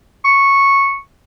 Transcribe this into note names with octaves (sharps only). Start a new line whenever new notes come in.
C#6